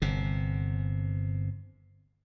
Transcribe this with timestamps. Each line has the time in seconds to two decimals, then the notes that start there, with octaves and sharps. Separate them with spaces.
0.02 G1 C3